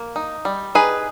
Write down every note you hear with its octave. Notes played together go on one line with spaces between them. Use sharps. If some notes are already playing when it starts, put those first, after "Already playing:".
Already playing: A#3
D#4
G3
D#4 G#4 B4